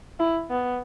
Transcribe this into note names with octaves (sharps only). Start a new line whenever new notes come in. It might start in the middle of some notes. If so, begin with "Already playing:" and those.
E4
B3